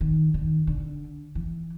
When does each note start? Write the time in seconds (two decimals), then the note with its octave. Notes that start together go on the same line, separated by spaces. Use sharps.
0.01 D#3
0.34 D#3
0.67 D3
1.35 E3